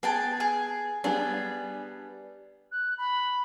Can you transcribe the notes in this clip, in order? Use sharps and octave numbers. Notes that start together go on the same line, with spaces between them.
B3 G#4 G5 A5
G#4
G3 B3 D4 G#4
F#6
B5